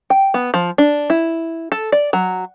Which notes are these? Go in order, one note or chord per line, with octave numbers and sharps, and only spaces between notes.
G5
B3
F3
D4
E4
A4
D5
F#3